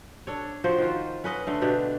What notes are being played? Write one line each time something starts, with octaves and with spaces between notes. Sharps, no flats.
D4 A4 C#5
F3 F#4 C5
D#3 F4
C#4 B4 D#5 F#5
D3 A3
B2 D4 G4